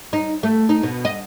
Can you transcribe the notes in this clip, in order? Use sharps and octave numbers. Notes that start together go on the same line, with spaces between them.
D#4
A3
D#4
B2
D#5